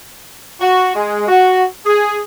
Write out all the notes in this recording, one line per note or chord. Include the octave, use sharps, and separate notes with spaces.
F#4
G#3
F#4
G#4